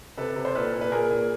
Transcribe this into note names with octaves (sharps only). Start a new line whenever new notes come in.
C3 A4 B4
C3
C5
A#2 A4 B4
A#2
B4
A#2 G#4 A#4
A#2